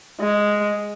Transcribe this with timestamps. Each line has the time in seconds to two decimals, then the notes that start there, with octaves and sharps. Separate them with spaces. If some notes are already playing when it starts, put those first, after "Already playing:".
0.20 G#3